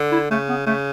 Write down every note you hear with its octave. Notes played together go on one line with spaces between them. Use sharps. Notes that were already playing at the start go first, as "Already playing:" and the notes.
Already playing: D3
E4
C#3 A3
B3
C#3 A3